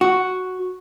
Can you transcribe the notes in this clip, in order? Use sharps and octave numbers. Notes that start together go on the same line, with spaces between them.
F#4